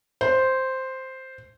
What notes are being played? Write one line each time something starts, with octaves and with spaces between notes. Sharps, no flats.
C5